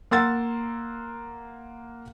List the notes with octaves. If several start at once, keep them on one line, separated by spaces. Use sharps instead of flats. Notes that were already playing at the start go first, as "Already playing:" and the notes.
A#3 F#5 C6 E6 A6